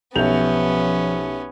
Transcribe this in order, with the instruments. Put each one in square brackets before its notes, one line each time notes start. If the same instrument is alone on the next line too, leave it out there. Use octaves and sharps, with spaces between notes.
[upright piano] B1 G6 F7 [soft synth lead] F3 [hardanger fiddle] B3 C#4 [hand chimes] G4 E5